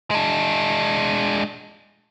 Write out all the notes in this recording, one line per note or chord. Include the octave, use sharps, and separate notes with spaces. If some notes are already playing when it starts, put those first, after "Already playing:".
G#3 D4